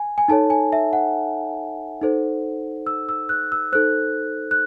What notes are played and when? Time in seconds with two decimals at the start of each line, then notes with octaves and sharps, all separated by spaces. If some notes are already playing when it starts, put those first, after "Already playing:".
Already playing: G#5
0.18 G#5
0.28 D#4 A4 C#5 A5
0.50 G#5
0.73 E5
0.93 F#5
2.01 D#4 A4 C5
2.87 E6
3.09 E6
3.29 F#6
3.52 E6
3.72 D#4 A4 C5 F#6
4.51 F#6